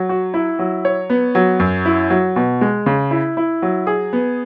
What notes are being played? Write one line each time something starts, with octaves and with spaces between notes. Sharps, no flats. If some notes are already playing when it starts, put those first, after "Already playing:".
Already playing: F#3
F#4
E4
F#3
C#5
B3
F#3
F#2
E4
F#3
B2
G#3
C#3
E4
E4
F#3
G#4
B3